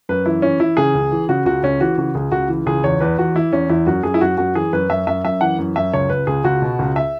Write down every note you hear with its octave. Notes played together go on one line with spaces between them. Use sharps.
F#2 B4
E3 E4
E3 C#4
E3 E4
C#3 G#4
C#2
E3
C#3 F#4
C#2 F#4
C#2 C#4
E3 F#4
C#3 F#4
C#2 G#4
C#2 F#4
E3
C#2 G#4
E2 C#5
E2 B4
E2 F#4
E3 E4
E2 C#4
E2 E4
F#2 F#4
F#2 G#4
E4
F#2 F#4
F#2 F#4
E3 G#4
F#2 B4
F#2 E5
F#2 E5
F#2 E5
E3 F#5
F#2
F#2 E5
C#2 C#5
C#2 B4
C#2 G#4
C#2 F#4
B2
C#2
E5